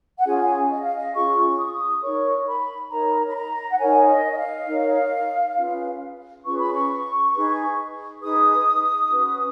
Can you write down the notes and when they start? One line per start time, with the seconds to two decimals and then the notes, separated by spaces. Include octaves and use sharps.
0.18 F#5
0.25 C#4 F4 G#4 G#5
0.70 D#5
0.83 F5
0.96 D#5
1.14 C#4 F4 G#4 C#6
1.59 D#6
1.66 C#6
1.72 D#6
2.03 D#4 A#4 C#5 C#6
2.47 B5
2.91 D#4 A#4 C#5 A#5
3.29 B5
3.35 A#5
3.70 F#5
3.79 D#4 A#4 C#5 G#5
4.08 D#5
4.32 D#5
4.38 F5
4.68 D#4 A#4 C#5
5.57 C#4 F4 G#4 B4
6.45 C#4 F4 G#4 B4 C#6
6.59 B5
6.73 C#6
7.34 D#4 G#4 B4
8.22 D#4 G#4 B4 D#6
9.10 C#4 F#4 B4